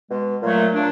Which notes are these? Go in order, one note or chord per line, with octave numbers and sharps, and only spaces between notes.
B2 G#3
A#2 F#3 A3
A#2 F#3 D4